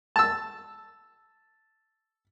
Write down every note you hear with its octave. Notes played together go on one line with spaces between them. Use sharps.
A5 E6